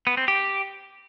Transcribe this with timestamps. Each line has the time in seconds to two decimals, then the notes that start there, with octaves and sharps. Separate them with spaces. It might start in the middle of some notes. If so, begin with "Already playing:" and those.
0.07 B3
0.17 C4
0.28 G4